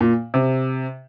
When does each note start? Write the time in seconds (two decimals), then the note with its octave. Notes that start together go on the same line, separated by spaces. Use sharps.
0.01 A#2
0.34 C3